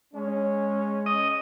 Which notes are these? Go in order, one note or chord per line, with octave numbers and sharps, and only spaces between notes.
G#3 C#4
D#5